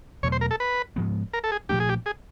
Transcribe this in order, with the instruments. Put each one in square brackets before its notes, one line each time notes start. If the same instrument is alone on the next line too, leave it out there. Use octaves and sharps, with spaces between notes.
[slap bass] E2 B2 F#3 A3 [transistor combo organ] C#5
[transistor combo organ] C5
A#4
A4
B4
[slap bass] G#2 F3 G#3 B3
[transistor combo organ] A#4
A4
G#4
[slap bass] A#2 F3 A3 D4 [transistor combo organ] G4
[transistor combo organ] G#4
G4
G#4